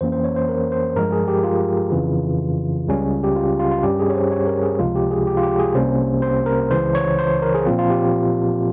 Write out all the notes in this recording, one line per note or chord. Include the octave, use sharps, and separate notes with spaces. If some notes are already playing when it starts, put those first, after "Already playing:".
F2 E3 A#3 C#4 C5
C5
C#5
C5
A#4
C5
G2 F3 G#3 A#4
G#4
G4
F4
F2 C#3 E3
C#2 C#3 G3 C#4
G4
F4
F4
F4
G2 G3 C#4 G4
G#4
C#5
C5
C#5
A#4
G#4
C#2 C3 F3 G#3 F4
G4
G#4
G4
F4
G4
G#4
C2 C3 G3 A#3 C#4 C5
C5
A#4
C#2 C#3 E3 C5
C#5
C5
A#4
G#4
A#2 F3 C4 F4
F4
G4